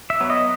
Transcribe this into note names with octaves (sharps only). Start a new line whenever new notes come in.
E5
F#3 B3
D#5